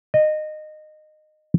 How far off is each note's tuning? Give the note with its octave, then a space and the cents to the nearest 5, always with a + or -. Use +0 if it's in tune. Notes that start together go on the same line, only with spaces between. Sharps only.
D#5 -20